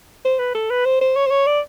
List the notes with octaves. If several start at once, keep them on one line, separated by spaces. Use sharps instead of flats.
C5
B4
A4
B4
C5
C5
C#5
C5
C#5
D5